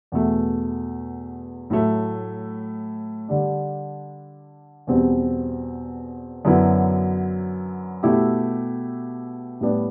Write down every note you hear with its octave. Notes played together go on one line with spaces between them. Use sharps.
E2 B2 A3
A2 F#3 A3
D3 G3 D4
E2 B2 G3 C4
F#2 D3 F#3 B3 E4
B2 A3 E4 G4
A2 G3 B3 D4 G4